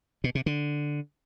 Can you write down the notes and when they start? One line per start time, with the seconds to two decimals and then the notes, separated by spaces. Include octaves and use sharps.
0.24 B2
0.35 C3
0.46 D3